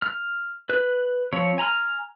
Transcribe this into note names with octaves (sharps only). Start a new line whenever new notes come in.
F6
B4 F#6
F3 C4 C#5
G#5 A#5 B5 F6